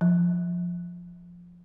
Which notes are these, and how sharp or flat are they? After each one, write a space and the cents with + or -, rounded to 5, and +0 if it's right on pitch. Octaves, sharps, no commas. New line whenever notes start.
F3 +5